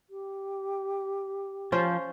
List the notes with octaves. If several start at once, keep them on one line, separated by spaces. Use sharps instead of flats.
G4
F3 C#4 F4 C5